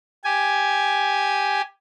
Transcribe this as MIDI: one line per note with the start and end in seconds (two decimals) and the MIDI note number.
0.24 1.62 67
0.24 1.62 80